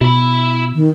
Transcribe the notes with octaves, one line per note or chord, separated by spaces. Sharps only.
B2 E4 B5
D#3